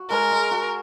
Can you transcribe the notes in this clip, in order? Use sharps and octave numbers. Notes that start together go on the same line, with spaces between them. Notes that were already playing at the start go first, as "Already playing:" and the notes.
Already playing: F#4
G#3 A#4
G#3
F#4